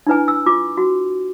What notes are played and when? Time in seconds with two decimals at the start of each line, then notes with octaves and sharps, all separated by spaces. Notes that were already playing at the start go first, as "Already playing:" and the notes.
0.07 D4 E4 B4 G#5
0.28 E6
0.46 F4 D6
0.77 F#4